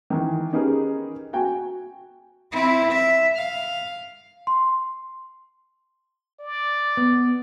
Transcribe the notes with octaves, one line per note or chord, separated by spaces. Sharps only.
D#3 E3
C#4 D#4 G4 G#4 A#4 B4
F#4 G5 G#5
C4 E4
E5
F5
C6
D5
B3